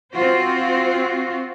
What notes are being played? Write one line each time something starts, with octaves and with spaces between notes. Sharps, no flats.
C4 F4 F#4 C5